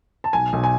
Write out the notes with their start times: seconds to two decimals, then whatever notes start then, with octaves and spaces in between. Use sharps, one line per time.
0.24 A5
0.33 B1 G#5
0.53 B1
0.64 G#5